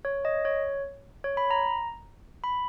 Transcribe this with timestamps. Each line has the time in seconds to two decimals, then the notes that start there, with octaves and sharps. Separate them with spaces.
0.05 C#5
0.25 D#5
0.45 C#5
1.24 C#5
1.37 B5
1.51 A#5
2.44 B5